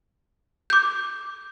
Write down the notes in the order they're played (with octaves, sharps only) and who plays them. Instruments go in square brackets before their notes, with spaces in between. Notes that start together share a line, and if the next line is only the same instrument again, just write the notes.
[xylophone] D6 G6